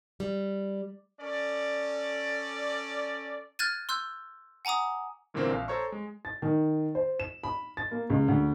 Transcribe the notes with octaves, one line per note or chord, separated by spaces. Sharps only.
G3
C#4 A4 D5
F6 F#6 G#6 A6 D#7
C6 E6 F#6 G6
F#5 G#5 A#5 D6 D#6
G2 A#2 D3 E3 A#3 C4
A#1 F5
A4 C5 C#5 A#5 C#6
G#3
A6
D#3
C5
E7
B5
A6
A#3
C#2
D2